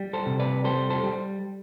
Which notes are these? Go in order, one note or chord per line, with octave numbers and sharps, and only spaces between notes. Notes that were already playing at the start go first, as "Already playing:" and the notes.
Already playing: G3
A4 C5
C3
B4 D5
G3 A4 C5
A4 C5
G3